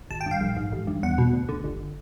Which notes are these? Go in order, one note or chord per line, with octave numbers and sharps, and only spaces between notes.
G#1 A5
G5
G2
F5
A#1
G#2
A1
G2
E2 F#5
B2
D2
D3
G1